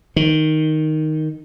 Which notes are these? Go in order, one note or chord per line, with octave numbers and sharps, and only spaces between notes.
D#3